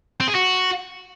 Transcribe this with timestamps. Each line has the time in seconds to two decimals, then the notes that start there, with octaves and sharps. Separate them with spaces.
0.20 C4
0.28 G#4
0.35 F#4